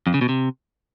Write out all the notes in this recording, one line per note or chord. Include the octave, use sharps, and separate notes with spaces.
F2
C#3
B2
C3